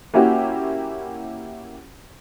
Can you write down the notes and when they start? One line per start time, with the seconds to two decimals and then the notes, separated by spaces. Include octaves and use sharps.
0.14 A#3 C#4 E4 F#4 G4